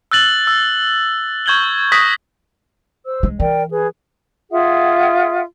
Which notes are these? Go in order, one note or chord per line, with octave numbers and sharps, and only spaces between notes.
E6 F#6 A6 F#7
E6
C#6 G6 G#6 F#7 G7
C#6 D#6 F#6 G6 A#6 B6
C5 E6
G#3
E3 A#4 D5 G5
G#4 B4
F4 G#4 E5 F#5